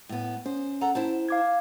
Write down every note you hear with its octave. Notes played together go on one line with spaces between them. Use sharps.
A2 B3
C#4 C5
A4 F#5 A#5
E4 C5 A5
F5 D6 G#6